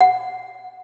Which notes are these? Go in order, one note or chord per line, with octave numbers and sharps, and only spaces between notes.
F#5